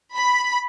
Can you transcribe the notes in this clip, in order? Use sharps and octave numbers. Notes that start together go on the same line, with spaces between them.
B5